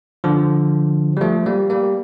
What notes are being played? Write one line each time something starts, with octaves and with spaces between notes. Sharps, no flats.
D3 F3
G3
F3 A3
G3 A#3
G3 A#3